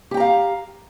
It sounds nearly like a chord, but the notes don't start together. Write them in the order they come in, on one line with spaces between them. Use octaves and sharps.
G4 G5 A#5 F5